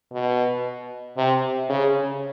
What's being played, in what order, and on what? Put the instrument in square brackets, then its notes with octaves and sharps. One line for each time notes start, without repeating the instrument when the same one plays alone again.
[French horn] B2
C3
C#3